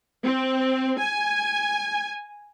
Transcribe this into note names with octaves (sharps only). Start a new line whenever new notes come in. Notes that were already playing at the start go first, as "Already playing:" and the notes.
C4
G#5